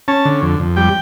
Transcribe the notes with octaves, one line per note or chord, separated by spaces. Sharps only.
C#4 A5
D3
F2
F2
G3 G5